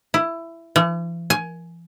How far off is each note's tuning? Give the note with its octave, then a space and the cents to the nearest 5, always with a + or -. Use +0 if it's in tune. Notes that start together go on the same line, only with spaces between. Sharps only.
E4 +15
E3 +45
G#5 +15